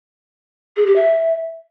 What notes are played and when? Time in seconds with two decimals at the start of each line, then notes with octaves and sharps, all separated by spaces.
0.77 G#4
0.86 G4
0.96 E5